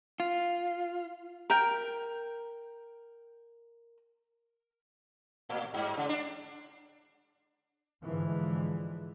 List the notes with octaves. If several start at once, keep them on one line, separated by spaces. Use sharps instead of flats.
F4
A#4 G5
A2
G2
C#3
D4
G#2 D3 E3 F3 G#3